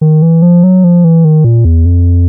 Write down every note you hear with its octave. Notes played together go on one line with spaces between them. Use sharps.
D#3
E3
F3
F#3
F3
E3
D#3
A#2
E2
F2